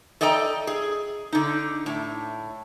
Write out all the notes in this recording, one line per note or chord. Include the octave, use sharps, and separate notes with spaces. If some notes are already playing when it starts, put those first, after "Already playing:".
A4 D5 D#5 G5 A#5
G#4
D3 D#4
A2